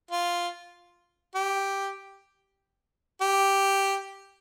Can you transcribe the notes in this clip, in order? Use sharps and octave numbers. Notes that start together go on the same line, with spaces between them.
F4
G4
G4